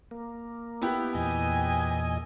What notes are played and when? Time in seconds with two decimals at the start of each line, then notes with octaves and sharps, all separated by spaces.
0.11 A#3
0.81 B3 E4 G4
1.15 E2 A#2 D#5 G#5